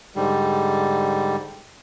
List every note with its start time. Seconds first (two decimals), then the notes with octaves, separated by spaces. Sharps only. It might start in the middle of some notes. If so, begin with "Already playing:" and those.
0.16 G#2 D3 G3